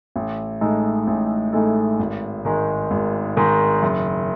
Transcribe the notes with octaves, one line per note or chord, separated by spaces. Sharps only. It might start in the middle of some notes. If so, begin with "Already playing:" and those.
A1
A2 G#3 D#4 A4
A1
A2 G#3 D#4 A4
G#1
G#2 D#3 G#3
G#1
G#2 D#3 G#3
F#1